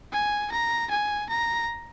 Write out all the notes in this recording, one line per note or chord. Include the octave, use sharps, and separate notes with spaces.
G#5
A#5
G#5
A#5